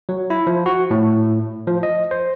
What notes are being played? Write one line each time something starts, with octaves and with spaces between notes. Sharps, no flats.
F#3
E4
F3
F#4
A2
F3
D#5
C5